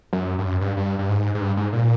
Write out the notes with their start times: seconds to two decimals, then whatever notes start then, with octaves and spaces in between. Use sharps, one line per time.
0.13 F#2
0.39 G2
0.46 F#2
0.61 G2
0.77 G2
0.99 G2
1.09 G#2
1.35 G#2
1.41 G2
1.57 G#2
1.73 A#2